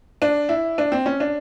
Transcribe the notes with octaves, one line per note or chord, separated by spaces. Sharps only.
D4
E4
D4
C4
C#4
D4